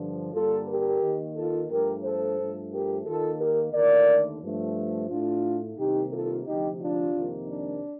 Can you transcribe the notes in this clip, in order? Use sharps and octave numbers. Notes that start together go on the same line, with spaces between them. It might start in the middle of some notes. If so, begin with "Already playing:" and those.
Already playing: G2 D3 F3
G2 D3 G3 A#3 F4 A4
G4 A#4
D#2 D#3 A#3
F4 A4
G2 F3 A3 G4 A#4
A4 C5
G2 F3 A3
G4 A#4
D#2 D#3 A#3 F4 A4
G4 A#4
D#2 D3 A3 A#4 D5
G2 F3 A3
A2 A3 D4 F4
C2 C3 D#3 A#3 D#4 G4
F4 A4
D2 C3 F3 D#4 G4
D4 F4
F2 C3 D#3 A#3
D4